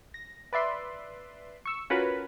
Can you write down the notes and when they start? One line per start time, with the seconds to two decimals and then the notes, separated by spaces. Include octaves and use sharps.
0.14 A#6
0.53 B4 D5 E5 C6
1.65 C#6 E6
1.90 C#4 F4 F#4 A#4 B4 B5